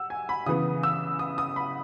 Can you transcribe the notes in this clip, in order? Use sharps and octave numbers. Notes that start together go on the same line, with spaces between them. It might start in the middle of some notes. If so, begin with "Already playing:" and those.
Already playing: F#5 E6
G#5
B5
C#3 E3 B3 D#6
E6
D#6
D#6
B5